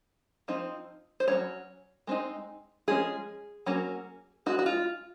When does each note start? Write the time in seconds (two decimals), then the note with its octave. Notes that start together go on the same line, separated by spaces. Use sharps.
0.48 F3 C4 D#4
1.20 C5
1.28 F#3 A#3 C#4 C#5
2.07 G#3 C4 D#4
2.88 F3 G#3 C#4 G#4
3.66 F#3 A#3 C#4
4.46 G#3 D#4 F#4
4.59 F#4
4.66 F4